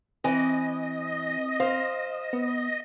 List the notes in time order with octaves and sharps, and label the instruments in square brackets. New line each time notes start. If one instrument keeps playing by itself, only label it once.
[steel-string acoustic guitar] E3 [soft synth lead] C4 [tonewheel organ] D#5 [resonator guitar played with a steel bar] G#5
[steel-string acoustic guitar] C5 [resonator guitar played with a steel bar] F5
[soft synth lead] B3